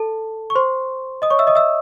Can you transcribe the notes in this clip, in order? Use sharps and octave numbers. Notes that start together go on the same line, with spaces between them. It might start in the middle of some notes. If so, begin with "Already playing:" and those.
Already playing: A4 A5
C#6
C5 C6
D#5 D#6
C#5 C#6
E5 E6
D#5 D#6
E5 E6